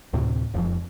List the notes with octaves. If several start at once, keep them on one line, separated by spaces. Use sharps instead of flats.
D2 A2 C3
E1 F2 F3